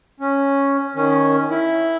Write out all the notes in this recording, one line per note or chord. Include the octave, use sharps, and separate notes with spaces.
C#4
D#3 C#4
E4